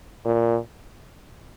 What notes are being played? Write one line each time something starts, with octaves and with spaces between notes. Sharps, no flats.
A#2